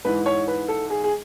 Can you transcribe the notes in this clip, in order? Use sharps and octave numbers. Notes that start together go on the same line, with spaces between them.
G#2 E3 B4
C#5
B4
A4
G#4
G#4